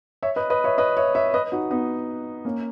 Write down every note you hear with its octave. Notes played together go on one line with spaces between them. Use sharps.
C#5 E5
B4 D#5
B4 D#5
C#5 E5
B4 D#5
C#5 E5
C#5 E5
B4 D#5
D#4 F#4
B3 D#4
A#3 C#4